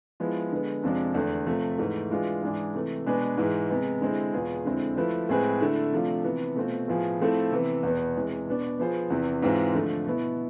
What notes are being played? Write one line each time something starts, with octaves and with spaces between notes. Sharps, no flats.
F3 G#3 B3 E4
D3 G#3 B3
F2 C3 F3 G#3 D4
E2 D3 A3
C3 F3 A3
G#2 E3 A3
E3 G#3 D4 F4
G#2 E3 G#3 D4 G#4
C3 E3 A3
B2 G#3 D4 G#4 B4
G#2 E3 G#3
C3 G#3 B3
D3 G#3 C4 E4
E2 B2 B3 F4 G#4
F2 D3 G#3 C4 E4
F3 A3 E4 B4
A2 G#3 C4 G#4 B4
D3 A3 E4
C3 F3 A3 D4 F4
C3 E3 B3
B2 A3 C4 F4
A2 F3 B3 F4 G#4
F3 A3 C4 E4 A4
C3 E3 B3
E2 B2 B3
C3 E3 G#3
B2 B3 D4
F3 B3 F4 G#4 C5
E2 C3 E3
G#2 E3 G#3 C4 F4
D3 F3 A3
B2 B3 E4